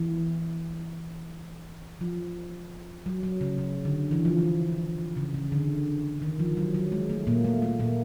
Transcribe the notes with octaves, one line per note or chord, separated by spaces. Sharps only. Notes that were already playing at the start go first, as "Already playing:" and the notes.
Already playing: E3
F3
F#3
F#3
C#3
C#3
D3
E3
F3
E3
C#3
C#3
D3
D#3
F3
F#3
F#3
G#3
A3
A#2 A#3
A3
A3
A#2 A#3